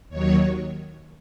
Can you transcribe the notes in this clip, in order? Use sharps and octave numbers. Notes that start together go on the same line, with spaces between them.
D#2 D#3 F#3 C#5